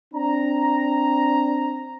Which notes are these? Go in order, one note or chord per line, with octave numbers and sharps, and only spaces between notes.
C4 D4 A#5